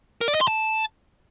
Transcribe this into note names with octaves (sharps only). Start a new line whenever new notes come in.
A#4
D5
D#5
C6
A5